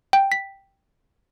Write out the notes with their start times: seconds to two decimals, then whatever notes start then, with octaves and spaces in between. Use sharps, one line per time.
0.13 G5
0.32 B6